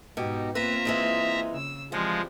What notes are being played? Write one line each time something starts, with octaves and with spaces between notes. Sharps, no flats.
G#2 B2 D#4 G4
A#3 C4 F4 B4 E5 A#5
E3 G#3 D#4
C#3 E6
E3 F3 G3 G#3 C4 F4